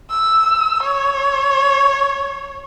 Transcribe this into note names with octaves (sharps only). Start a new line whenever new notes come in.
E6
C#5